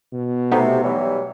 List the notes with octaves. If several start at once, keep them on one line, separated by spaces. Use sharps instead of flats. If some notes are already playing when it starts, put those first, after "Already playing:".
B2
C3 A3 B3 D#4
E3 F#3 G3